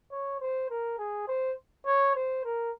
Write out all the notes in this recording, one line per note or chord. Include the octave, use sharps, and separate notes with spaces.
C#5
C5
A#4
G#4
C5
C#5
C5
A#4